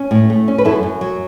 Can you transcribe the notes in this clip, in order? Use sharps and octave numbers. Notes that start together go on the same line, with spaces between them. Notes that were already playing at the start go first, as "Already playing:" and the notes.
Already playing: C#4
A2
A3
C#4
B4
F#2 E4 A4
F#2
F#3